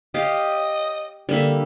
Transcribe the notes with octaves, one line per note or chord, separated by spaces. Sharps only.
G4 D#5 F5
D3 G3 A#3 E5